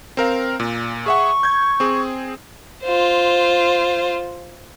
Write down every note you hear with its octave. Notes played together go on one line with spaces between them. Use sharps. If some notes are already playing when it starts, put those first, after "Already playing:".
C4 A#4 F5
A#2
G#4 E5 F#5 C#6
G6 G#6
C4 G#4
F4 C5